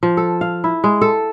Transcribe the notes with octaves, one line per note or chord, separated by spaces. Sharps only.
F3
A4
F5
E4
G#3
A4